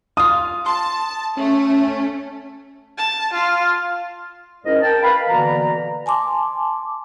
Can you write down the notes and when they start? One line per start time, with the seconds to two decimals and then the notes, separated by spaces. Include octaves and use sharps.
0.17 F4 F5 D#6
0.66 A5 C6
1.37 A3 C#4
2.98 A5
3.33 F4
4.65 G#2 C#4 E4 A#4 D#5
4.82 A#4 G5 A5
5.03 B4 F5 B5
5.29 B2 D3 E3 A#3 D5 A#5
6.06 G#5 A5 C6 D6